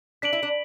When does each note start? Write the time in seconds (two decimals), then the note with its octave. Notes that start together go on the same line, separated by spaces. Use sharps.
0.22 D4 B6 D7 F#7
0.33 E4
0.43 D4